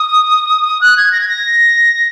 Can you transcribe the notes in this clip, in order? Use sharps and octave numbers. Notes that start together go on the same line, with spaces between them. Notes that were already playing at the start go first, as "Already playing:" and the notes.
Already playing: D#6
F#6
G#6
A#6
G#6
A#6